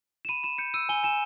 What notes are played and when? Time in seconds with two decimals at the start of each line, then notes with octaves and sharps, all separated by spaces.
0.25 E7
0.29 B5 D#7
0.43 B5 E7
0.58 G6 C#7
0.74 E6 D#7
0.89 G#5 G7
1.04 G#5 E7